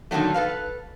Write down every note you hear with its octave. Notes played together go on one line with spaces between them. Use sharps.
A#2 D3 D#3 F#3 A3
A4 B4 F5